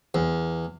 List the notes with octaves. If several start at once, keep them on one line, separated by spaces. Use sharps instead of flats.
E2